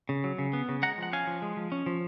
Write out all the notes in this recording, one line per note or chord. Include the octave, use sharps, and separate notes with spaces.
C#3
F#3
C#3
B3
C#3
G#3 F#5 A#5
F3 F#5
C#4 F5 G#5
F3
G#3
F3
C#4
F3